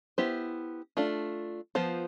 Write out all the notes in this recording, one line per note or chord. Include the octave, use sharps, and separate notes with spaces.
B3 E4 G4 C5
A3 D4 F4
F3 B3 F4 C5